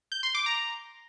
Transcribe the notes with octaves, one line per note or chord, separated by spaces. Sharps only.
G6
C6
D6
A#5